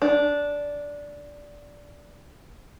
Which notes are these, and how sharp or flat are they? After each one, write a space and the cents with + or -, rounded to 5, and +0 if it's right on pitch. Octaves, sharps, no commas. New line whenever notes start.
D4 -10